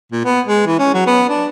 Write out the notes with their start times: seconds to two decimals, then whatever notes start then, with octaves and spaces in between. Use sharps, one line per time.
0.12 A#2
0.25 B3
0.47 G#3
0.66 E3
0.79 C#4
0.94 F#3
1.07 B3
1.29 D4